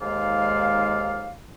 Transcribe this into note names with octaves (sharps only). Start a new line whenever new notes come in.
D#2 G#2 G#3 D5 F5